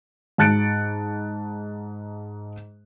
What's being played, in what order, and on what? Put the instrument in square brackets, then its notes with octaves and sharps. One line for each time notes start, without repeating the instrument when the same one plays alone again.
[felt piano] G#2 A5 F#6 A6 C#7 D7